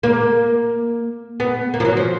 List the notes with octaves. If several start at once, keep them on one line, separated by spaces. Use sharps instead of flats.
A#3
B3
A#3
F3
F#3
F3